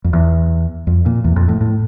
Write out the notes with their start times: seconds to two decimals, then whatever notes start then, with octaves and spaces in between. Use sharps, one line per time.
0.04 F2
0.13 E2
0.87 F2
1.06 A#2
1.24 E2
1.36 F2
1.49 A2
1.61 A2